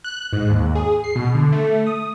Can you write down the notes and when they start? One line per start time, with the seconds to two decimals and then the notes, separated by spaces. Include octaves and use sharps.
0.04 F#6
0.33 G#2
0.50 D#2
0.75 G#4
1.04 C7
1.15 B2
1.35 D3
1.52 A3
1.87 D#6